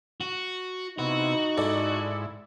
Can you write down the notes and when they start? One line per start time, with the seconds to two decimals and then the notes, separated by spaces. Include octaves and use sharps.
0.21 F#4
0.98 C3 B3 D#4 E4 F#4
1.57 G#2 E4 A4 D5